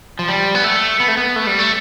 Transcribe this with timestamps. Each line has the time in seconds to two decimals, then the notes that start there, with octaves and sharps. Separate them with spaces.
0.19 F3
0.28 G3
0.55 B3
0.64 A3
1.00 B3
1.08 A3
1.17 B3
1.36 A3
1.47 G3
1.59 A3